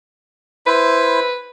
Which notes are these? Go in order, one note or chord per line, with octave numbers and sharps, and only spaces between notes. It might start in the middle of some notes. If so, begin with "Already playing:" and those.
E4 B4 C5